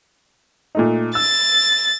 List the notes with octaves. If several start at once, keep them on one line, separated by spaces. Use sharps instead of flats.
A#2 A3 D#4
E6 A6